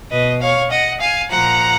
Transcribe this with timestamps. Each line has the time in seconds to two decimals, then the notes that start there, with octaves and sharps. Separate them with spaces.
0.10 B2 B4 D#5
0.40 C#5 F5
0.71 D#5 F#5
1.00 F5 G#5
1.30 A#2 F3 F#5 A#5